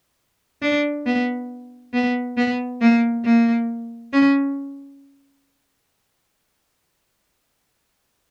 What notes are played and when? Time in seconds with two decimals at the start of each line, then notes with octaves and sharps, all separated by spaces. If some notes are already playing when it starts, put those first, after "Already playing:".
0.62 D4
1.06 B3
1.94 B3
2.37 B3
2.81 A#3
3.25 A#3
4.13 C#4